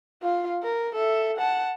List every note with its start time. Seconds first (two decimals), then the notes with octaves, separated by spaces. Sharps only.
0.22 F4 F5
0.63 A#4
0.96 A4 E5
1.37 F#5 A5